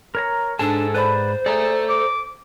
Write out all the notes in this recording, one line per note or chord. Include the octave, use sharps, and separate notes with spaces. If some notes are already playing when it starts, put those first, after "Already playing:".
A#4 C#5 A#5
G#2 D4 G#4 A4 A5 E6
B4 C5 D5 B5
G#4 A4 D5 E5 A#5
D6